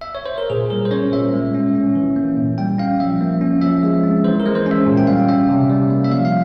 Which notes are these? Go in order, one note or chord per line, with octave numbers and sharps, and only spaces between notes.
E5
C#5
C5
A#4
A#2 G#4
G3 A#4
C5
C#4 C#5
A#2 E5
G#3
C#4
C#4
E3
A#3
A#2
G3 G5
C#4 F5
F3 E5
A#3
C#4
F3 E5
G#3
C4
E3 C5
A#4
G#3
C5
C#4
E5
A#2
G5
G3 F5
C#4 E5
C3
G3
A#3
E5
F3 F5
F5